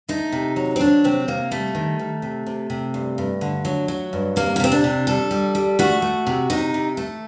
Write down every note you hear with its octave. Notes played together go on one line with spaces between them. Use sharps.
A3 D#4
C3
F#3
C4
F#3 D4
C3 C4
C3 A#3
G3 A3
D#3
D#3
C3
C3
C3
G2
G2
D3
F#3
F#3
G2
C3 A#3
A#3
C3 C4
D4
C3
G3 A4
G3
G3
A3 F#4
A3
C3
C3 D#4
C3
A3